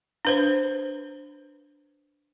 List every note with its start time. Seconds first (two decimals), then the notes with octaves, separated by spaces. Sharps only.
0.25 D4 B4 C5